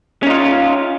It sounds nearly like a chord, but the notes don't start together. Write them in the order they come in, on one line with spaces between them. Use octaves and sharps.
C#4 D#4 F4